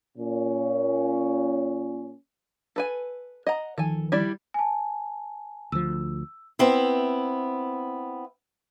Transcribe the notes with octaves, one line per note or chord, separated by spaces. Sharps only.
A#2 C#4
A4 B4 G#5
D#5 F#5 A#5
D2 D#3 F3 A4 G#5
G3 E4 D5
G#5 A5
D2 F3 E6
B3 C4 E4